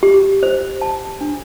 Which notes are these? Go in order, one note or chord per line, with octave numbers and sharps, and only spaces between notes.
G4
C5
A5
D4